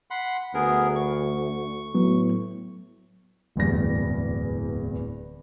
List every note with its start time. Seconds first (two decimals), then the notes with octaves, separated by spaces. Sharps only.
0.10 F#5 B5 C6
0.54 D2 B3 G#4 A#4
0.96 C#6
1.95 A2 F#3 B3
3.56 D1 E2 G2 A#6